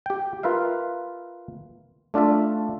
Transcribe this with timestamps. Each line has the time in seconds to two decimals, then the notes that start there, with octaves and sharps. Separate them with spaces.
0.06 G4 G5
0.43 F4 A#4 B4 E5 F5
2.14 A3 D4 F4 A4 E5